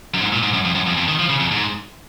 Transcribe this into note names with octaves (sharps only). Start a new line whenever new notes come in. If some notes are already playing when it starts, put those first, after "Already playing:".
F#2
G#2
A#2
G#2
F#2
F2
F#2
F2
F2
D#3
F3
C#3
F2
G#2